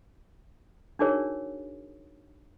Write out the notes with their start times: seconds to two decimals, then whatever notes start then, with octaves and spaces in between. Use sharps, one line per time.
0.99 D4 D#4 F#4 G#4 A#4 C#5